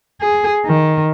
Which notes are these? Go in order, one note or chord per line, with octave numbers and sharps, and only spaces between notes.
G#4
D#3